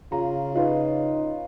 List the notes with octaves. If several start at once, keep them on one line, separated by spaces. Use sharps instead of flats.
C#3 F4 A#5
D#4 F4 B4 C#5